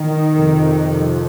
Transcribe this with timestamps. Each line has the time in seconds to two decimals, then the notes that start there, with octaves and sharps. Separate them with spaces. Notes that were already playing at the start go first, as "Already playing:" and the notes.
Already playing: D#3
0.33 F2 C3
0.95 F3